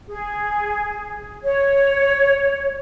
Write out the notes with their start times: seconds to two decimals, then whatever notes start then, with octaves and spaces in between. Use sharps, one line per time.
0.09 G#4
1.43 C#5